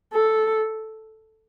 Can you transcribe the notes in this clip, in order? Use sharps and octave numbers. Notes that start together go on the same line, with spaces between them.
A4